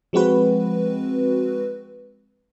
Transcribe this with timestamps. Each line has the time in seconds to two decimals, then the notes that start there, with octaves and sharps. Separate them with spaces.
0.13 F3 G#3 C4 F#4 B4